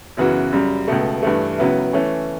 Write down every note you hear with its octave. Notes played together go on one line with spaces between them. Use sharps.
F#2 C#3 E3 B3 F#4
F#2 C#3 G3
C#2 B2 A3
G2 E3 A3
C#2 C#3 F#3 B3 E4
E3 A3 C#4